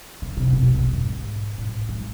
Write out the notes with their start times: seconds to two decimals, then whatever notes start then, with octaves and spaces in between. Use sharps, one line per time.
0.22 D3
0.37 C3
0.53 B2
0.63 F2
0.67 E2
0.83 F2
0.98 G#2
1.58 A2
1.89 G#3